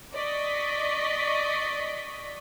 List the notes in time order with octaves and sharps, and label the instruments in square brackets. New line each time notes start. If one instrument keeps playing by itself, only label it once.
[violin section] D5 D#5 C#6 B6